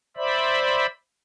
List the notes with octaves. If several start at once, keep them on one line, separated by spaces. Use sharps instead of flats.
C5 D5 E5 B5